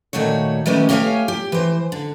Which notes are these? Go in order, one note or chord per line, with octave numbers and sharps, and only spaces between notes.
A#2 D#3 A3 F#4 C#5
D#3 A3 B3 C#4 G4 C#5
A3 G4 C#5 D#5 F5 G#5
G4
E3 C5
D3